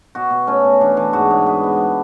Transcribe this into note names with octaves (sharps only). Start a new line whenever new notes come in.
B2 F#4
B2
A3 C#4
B2
E3 D4
E3
G#2 F#4
G#2
B3 B4
B3